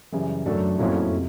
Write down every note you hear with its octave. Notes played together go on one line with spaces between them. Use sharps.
F#2 C#3 E3 G3
F#2 A3 D4 F#4 A4
F2 A2 F#3 A#3 C#4 E4
C3